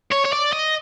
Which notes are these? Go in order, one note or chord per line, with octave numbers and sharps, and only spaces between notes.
C#5
C#5
D5
D#5